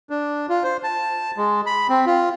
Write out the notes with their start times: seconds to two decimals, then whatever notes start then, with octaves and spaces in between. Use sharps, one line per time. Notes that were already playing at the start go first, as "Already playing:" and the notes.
0.10 D4
0.49 F4
0.63 C5
0.83 A5
1.37 G#3
1.66 B5
1.89 C4
2.06 F4